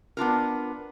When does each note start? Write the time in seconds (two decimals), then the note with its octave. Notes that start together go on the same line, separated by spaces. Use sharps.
0.17 B3 D4 F4 A#4